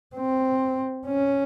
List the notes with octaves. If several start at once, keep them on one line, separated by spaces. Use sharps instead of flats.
C4
C#4